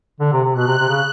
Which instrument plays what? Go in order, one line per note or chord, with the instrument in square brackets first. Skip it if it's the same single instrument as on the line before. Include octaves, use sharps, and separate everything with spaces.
[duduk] D3
C3
C3
[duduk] B2 [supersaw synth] F#6
[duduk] C3
C3
C#3